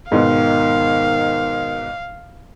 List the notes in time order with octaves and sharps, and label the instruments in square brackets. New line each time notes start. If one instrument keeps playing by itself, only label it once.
[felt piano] G#2 B2 [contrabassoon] D#3 [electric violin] F5